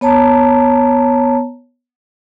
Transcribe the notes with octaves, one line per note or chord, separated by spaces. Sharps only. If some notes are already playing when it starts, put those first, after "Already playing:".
B3 C#5 A5 A#5